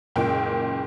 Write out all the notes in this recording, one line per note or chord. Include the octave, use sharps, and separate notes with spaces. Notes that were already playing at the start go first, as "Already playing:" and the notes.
F#1 C#2 A#2 G5